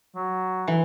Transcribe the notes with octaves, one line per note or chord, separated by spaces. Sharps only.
F#3
E3